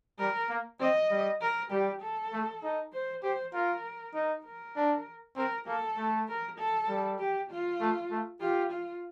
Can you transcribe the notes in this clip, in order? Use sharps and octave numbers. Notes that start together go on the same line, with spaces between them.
G3 A#4
A#3
C4 D#5
G3
A#4
G3 G4
A4
A3
D#4
C5
G4 C5
F4 A#4
D#4
A#4
D4
C4 A#4
A#3 A4
A3
A#4
A4
G3
G4
F4
A3
A3
F4 G4
F4